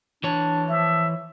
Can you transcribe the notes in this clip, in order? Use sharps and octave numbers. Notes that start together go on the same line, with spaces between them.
E3 D4 C#5
F3 E5